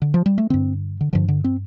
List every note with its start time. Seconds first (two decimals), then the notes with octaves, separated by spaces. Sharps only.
0.02 D3
0.14 F3
0.26 G3
0.38 A3
0.50 G2 D3 C4
1.01 D3
1.13 G2 D3 F3
1.28 D3
1.44 C4